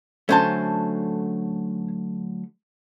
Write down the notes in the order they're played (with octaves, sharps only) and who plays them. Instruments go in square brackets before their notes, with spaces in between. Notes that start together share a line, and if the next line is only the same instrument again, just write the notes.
[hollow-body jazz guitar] D3 F#3 A3 [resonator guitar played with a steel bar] C#4 C5 A5